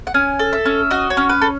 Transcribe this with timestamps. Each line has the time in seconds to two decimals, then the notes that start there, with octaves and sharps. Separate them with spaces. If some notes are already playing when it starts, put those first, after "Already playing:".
0.07 F#5
0.14 C#4 G#5
0.39 A4
0.53 E5
0.65 C#4
0.91 F#4 D#5
1.10 C#5
1.17 C#4
1.29 B4
1.42 A4